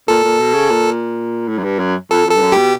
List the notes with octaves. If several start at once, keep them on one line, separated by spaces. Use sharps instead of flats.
A#2 A4
A#2
B2
C#3
A#2
A2
F#2
G2
F#2
F2 A4
F2
G2 A4
F#2
B2 G4